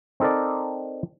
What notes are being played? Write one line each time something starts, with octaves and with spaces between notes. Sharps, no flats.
C4 D#4 A4 A#4 D5